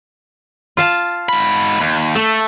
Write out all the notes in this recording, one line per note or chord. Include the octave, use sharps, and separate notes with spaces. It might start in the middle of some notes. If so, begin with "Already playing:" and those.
F4 F5 A5
G#2 B5
D#2
A3 A4